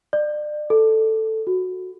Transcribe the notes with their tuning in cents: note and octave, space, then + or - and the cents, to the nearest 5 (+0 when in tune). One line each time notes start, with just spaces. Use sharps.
D5 +35
A4 +5
F#4 -10